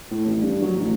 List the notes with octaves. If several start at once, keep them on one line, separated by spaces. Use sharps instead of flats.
A2
A1
G2
F#3
A1